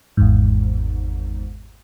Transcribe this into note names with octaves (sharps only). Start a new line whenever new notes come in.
G#1 E2 G#2